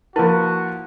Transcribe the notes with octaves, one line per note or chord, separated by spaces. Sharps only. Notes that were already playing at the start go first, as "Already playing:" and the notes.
F3 A#3 E4 F#4 B4